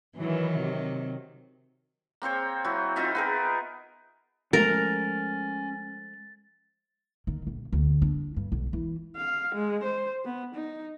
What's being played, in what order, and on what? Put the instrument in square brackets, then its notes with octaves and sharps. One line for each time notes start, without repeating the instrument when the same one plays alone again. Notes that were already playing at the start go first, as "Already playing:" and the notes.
[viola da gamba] D#3 F#3 [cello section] E3
[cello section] C3
[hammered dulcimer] A#3 C4 C5 C#5
F#3 E4
C4 D#4 F4 E5
B3 G#4 A#4
[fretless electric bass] F3 G#3 A3 [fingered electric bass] C#4 [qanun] A#4 [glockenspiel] A6
[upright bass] D#3
A#1
D2
D4
G2
B1
E3
[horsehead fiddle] F5
G#3
C5
B3
D#4